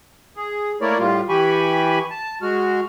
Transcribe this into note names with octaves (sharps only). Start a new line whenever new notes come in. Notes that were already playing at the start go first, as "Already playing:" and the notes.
G#4
A3 A#3 E4 A#4 C#5 D5
A2 G3 F4
E3 G4 G#5 B5 C#6
A5
G#3 F#4 F6